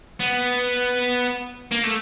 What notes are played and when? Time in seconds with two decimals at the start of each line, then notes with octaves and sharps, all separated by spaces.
0.20 B3
1.72 A#3
1.84 A3